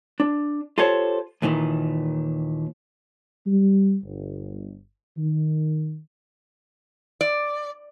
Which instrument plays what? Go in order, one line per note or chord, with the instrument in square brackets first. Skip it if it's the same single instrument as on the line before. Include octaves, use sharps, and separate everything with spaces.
[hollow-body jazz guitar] D4
F4 G4 A4 C5 C#5
D#2 A#2 D#3 E3
[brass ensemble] G3
G1
D#3
[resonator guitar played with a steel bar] D5